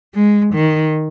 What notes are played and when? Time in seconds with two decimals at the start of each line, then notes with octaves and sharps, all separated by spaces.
0.15 G#3
0.54 D#3